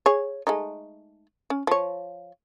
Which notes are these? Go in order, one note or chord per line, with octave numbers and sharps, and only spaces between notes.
G#4 C#5
G#3 A3 D#4
C#4
F3 C#5